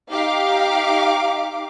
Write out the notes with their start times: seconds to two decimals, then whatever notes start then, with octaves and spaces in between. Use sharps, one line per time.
0.10 D#4 G4 F5 D6